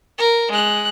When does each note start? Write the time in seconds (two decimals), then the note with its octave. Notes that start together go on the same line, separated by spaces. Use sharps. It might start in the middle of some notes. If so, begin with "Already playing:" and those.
0.18 A#4
0.51 G#3 F#6